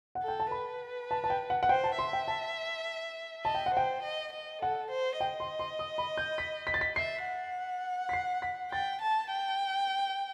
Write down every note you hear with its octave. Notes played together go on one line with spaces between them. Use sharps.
F#5
A4
G5
A5
B4 B5
A5
A5
G5
F#5
F#5
C5 G5
A5
E5 C6
G5
A5
D#5 A5
G5
F#5
C5 G5
D#5
D#5
A4 F#5
C5
D#5 G5
C6
C6
D#6
B5
G6
B6
B6
A6
B6
E5 C7
F#5
B6
C7
B6
G5 A6
A5
G5